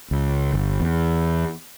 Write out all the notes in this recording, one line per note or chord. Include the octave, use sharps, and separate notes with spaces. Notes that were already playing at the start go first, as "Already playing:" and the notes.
C#2
G1
E2